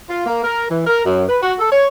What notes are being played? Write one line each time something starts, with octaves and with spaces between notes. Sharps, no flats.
F4
A#3
A#4
E3
A#4
F#2
B4
F#4
A4
C#5